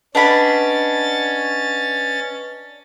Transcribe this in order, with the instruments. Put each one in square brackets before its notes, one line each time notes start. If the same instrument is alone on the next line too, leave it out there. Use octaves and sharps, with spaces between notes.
[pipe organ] C#4 A6 [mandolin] D4 F#5 B5 [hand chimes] B4 D#5